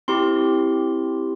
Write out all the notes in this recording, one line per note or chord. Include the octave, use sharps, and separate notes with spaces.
C4 E4 G4 C6